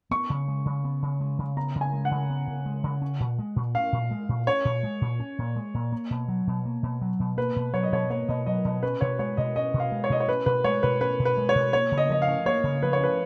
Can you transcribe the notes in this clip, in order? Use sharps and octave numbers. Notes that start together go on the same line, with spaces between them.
B3 C#6
C#3
G#3
C#3
B3
C#3
G#3
C#3
B3 A#5
C#3
G#5
G#3
F#5
C#3
B3
C#3
G#3
C#3
C#4
A#2
G#3
A#2
C#4 F5
A#2
G#3
A#2
C#4 C#5
A#2
G#3
A#2
C#4
A#2
G#3
A#2
A#3
B2
F#3
B2
A#3
B2
F#3
B2
A#3 B4
B2
F#3 C#5
D#5
B2 C#5
A#3 C#5
B2 D#5
F#3 D#5
B2 D#5
C#4 B4
B2 C#5
G#3 C#5
B2 D#5
C#4 D#5
B2
F5
G#3
C#5
B2 D#5
C#5
C#4 B4
B2 B4
G#3 C#5
B2 B4
C#4 B4
B2
B4
G#3
C#5
B2
A#3 C#5
C#3
D#5
F3 D#5
F5
C#4
A#3 C#5
C#3
F3 B4
C#5
C#4 B4